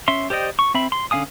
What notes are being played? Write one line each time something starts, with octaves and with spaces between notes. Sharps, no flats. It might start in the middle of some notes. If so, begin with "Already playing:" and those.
C#4 E5 C6
G4 C5 D5 D#5 G5
C#6
C4 E5 B5
C6
D3 C#4 F5 G#5 D#6